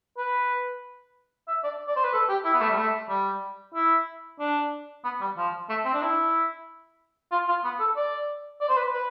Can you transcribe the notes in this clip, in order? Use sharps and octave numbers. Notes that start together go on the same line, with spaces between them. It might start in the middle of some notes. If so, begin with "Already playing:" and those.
B4
E5
D5
D5
C5
B4
A4
G4
E4
B3
A3
G3
A3
G3
E4
D4
B3
G3
F3
A3
C4
D4
E4
F4
F4
B3
A4
D5
D5
C5
B4
B4